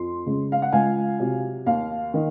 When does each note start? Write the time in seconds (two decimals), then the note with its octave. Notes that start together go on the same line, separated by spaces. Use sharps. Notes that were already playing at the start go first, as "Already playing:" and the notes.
Already playing: F2 C6
0.26 C#3 G#3
0.52 F5
0.62 F#5
0.72 C#2 F5 G#5
1.20 C3 F#3
1.66 D#2 F5
2.14 D#3